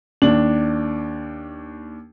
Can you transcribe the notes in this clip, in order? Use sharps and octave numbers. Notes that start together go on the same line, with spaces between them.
D#2 D4 F#7